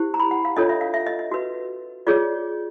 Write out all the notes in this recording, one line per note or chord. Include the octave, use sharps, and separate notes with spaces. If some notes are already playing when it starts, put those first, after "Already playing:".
Already playing: E4 G4 C5
A#5
B5
F#5
F5
D4 F4 A4 C#5 D#5
E5
F5
E5
D#5
D#5
F#4 B4
F4 G#4 C#5 D5